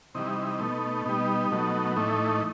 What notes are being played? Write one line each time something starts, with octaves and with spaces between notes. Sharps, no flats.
C3 E3 G3 D#4
B2 A3
B2 G3 D#4
B2 F#3 A3
A2 E3 A3 D#4